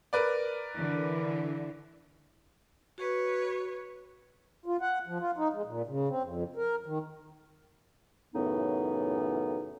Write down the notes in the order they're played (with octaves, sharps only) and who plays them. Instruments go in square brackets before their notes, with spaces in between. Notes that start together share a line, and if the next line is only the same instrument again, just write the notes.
[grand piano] A#4 B4 D5
[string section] D3 E3
[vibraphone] F#4 [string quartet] B4 C#5
[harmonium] F4
F#5
F3
F4
D#4
G#3
A#2
C#3
C4
F2
A#4
D#3
[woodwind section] F#2 A2 C#3 E3 B3 D#4